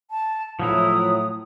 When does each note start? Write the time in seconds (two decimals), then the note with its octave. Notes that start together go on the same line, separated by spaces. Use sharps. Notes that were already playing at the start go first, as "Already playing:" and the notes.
0.11 A5
0.60 A2 F3 F#3 E4 D#6